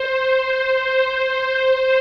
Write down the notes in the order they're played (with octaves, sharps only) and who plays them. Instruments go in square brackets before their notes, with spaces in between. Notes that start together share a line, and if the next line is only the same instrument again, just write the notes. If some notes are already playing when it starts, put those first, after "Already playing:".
Already playing: [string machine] C5
C5
C5
C5